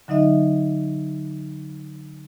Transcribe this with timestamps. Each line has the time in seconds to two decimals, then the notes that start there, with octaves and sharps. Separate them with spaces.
0.08 D3 F#3 D#4 D#5 E5